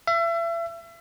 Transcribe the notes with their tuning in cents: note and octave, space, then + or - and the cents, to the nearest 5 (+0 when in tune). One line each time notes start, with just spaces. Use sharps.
E5 +35